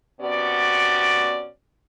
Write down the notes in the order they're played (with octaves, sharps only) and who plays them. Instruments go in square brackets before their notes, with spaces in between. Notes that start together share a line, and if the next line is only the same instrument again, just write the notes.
[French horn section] C3 B3 C#4 F#4 D5